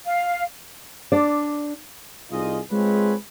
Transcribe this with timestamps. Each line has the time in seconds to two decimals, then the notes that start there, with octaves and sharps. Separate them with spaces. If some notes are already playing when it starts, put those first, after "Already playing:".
0.05 F5
1.12 D4 D5
2.31 C2 D#4 F4 G#4 D#5
2.72 G#3 C4 F4 G#4 B4 C#5